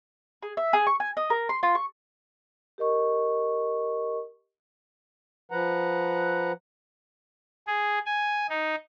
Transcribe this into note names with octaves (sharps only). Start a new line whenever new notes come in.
G#4
E5
G#4
C#6
G#5
D#5
A#4
C6
F4
C#6
G4 A#4 D#5 C#6
F3 B4 F#5 A#5
G#4
G#5
D#4